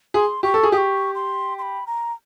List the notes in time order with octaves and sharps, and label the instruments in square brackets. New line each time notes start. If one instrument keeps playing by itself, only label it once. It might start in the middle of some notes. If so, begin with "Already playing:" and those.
[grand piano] G#4 [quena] C6
[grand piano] G4 [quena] C#6
[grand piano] A4
G#4
[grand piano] G4 [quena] D#6
[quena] C#6
C6
C6
B5
A#5